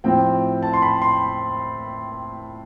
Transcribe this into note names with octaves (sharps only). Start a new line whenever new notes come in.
A2 F3 C4 G5
A5
C6
B5
C6